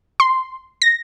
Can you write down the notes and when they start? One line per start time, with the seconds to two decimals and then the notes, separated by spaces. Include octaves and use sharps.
0.20 C6
0.82 A#6